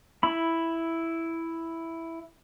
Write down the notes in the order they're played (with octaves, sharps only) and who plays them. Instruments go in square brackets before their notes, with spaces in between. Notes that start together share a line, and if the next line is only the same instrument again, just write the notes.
[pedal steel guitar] E4 B5